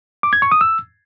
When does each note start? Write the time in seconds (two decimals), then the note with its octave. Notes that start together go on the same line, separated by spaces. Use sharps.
0.23 D6
0.33 G#6
0.42 C#6
0.52 D#6
0.61 E6